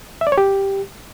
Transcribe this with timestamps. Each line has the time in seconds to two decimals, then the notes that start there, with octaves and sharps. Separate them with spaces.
0.21 E5
0.27 D5
0.32 C#5
0.38 G4